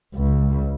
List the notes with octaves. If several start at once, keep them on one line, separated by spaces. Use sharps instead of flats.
C#2